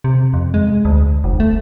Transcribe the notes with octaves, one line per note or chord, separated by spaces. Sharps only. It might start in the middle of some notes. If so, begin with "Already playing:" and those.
C3
F2
G#3
D2
F1
A3